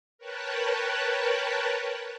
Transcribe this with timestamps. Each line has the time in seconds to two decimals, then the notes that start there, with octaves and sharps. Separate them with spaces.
0.18 A#4 B4 C#5 G5 A5 F#6